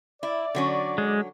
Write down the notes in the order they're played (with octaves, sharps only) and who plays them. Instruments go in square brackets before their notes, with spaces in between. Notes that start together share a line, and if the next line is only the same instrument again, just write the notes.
[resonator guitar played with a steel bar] E4 [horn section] D5
[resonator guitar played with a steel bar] D3 F#3 C#4
[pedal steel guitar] G#3